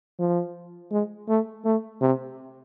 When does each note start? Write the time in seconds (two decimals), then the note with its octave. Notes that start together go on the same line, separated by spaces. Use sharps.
0.19 F3
0.91 G#3
1.28 A3
1.65 A3
2.01 C3